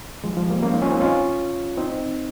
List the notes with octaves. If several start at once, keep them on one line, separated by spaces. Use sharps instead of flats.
F3 G#3
F3 G#3
G3 A#3
A#3 C#4
C4 D#4
C#4 F4
C4 D#4
C#4 F4
C4 D#4